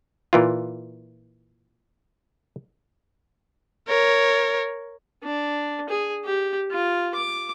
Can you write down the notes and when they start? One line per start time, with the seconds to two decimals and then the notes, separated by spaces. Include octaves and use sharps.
0.33 A#2 E3 F4
3.88 A#4 C#5
5.23 D4
5.89 G#4
6.25 G4
6.71 F4
7.14 D6